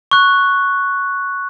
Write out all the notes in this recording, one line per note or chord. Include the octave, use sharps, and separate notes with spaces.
C#6 F#6